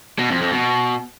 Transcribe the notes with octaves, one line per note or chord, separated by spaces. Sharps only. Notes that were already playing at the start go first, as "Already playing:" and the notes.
B2
F2
F2
B2